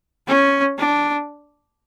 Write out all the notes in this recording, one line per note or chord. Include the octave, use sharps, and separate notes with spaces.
C#4
D4